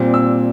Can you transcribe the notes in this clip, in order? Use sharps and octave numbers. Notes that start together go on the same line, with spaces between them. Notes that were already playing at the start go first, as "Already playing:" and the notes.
Already playing: A#2 G3 C4
E6